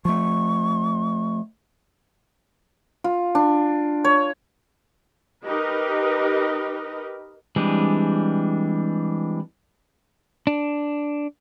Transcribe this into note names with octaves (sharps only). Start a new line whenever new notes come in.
F3 A3 C#6
F4
D4
C#5
D#4 G4 A#4 B4 D#5
E3 G3 G#3 C4 D4
D4